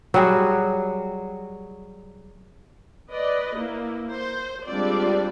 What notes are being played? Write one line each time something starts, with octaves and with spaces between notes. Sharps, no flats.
F#3 G3 F#4 G#4
B4 D5 D#5
A#3 E4
C5
G3 G#3 C4 D4 F4 D5